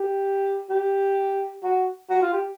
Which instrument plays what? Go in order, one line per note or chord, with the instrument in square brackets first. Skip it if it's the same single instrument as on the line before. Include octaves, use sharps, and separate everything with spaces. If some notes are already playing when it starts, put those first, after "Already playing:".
Already playing: [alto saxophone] G4
G4
F#4
F#4
F4
G4